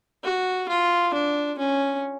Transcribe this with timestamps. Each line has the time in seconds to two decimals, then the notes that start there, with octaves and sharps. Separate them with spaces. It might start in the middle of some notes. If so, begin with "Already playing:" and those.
0.24 F#4
0.69 F4
1.14 D4
1.58 C#4